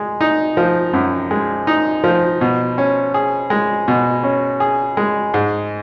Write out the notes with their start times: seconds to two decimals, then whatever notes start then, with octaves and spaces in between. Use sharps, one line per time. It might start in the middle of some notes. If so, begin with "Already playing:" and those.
Already playing: G#3
0.21 D#4
0.57 F3
0.93 F#2
1.31 G#3
1.67 D#4
2.04 F3
2.41 B2
2.78 C#4
3.14 G#4
3.50 G#3
3.88 B2
4.24 C#4
4.60 G#4
4.97 G#3
5.34 G#2